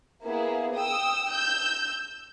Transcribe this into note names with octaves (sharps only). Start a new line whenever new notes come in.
A#3 B3 E4 G#4
G5 D#6 E6
E6 G6